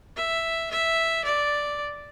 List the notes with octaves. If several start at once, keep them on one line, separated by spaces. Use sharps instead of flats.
E5
E5
D5